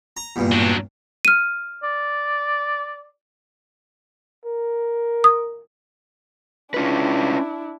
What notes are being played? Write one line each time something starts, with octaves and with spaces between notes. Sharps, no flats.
A#5
E2 G2 A#2
F#3 D4
F6 D#7
D5
A#4
D#6
C#4 D4 E4 F4 B4